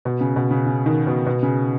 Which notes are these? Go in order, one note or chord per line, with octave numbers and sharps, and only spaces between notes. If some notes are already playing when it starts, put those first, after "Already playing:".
B2
C#3
B2
C#3
C#3
D#3
B2
B2
C#3